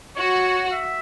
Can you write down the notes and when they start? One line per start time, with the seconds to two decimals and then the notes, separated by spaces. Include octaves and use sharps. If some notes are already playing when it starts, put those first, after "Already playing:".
0.16 F#4 C#5
0.72 E5